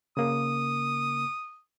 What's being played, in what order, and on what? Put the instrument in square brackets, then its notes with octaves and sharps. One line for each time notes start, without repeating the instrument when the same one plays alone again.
[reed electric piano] C#3 A#3 [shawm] D#6